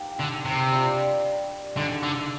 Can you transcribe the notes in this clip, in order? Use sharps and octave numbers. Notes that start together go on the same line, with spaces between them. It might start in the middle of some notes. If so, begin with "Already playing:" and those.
Already playing: A#3 D#4 G4
D3
C3
G3 D4 F4
D3 D#4 G#4 D#5
D3